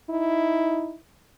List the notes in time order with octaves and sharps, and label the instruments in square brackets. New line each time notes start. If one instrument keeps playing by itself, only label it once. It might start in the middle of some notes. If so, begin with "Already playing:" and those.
[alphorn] D#4 [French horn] E4